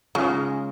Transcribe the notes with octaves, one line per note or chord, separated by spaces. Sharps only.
C#3 G#3 C#4 D#4 F4